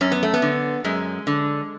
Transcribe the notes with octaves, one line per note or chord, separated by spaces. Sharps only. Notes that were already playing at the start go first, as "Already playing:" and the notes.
F#2 C#4
B3
A3
B3
D3
F#2 G#3
D3